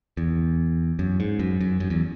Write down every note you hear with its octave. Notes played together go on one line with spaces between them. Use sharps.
E2
F#2
G#2
F#2
F#2
F#2
E2